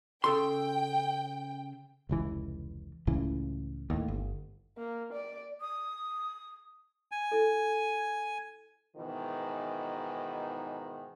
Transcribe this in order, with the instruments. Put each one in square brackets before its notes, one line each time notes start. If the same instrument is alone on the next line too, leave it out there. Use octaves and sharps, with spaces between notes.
[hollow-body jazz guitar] C#3 A4 C6 [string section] G5
[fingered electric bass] F1 C#2 E3
C#2 A2 C#3 E3
D#2 A2
G1
[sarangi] A#3
D5
[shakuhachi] D#6
[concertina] G#5
[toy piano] E4 A4
[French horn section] G#2 B2 D#3 E3